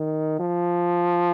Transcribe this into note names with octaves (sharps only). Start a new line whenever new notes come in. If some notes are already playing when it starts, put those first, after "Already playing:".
Already playing: D#3
F3